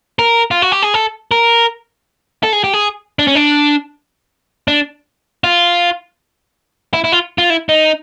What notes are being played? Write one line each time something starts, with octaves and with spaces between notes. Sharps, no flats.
A#4
F4
F#4
G4
G#4
A4
A#4
A4
G#4
G4
G#4
D4
C#4
D4
D4
F4
E4
E4
F4
F4
E4
D#4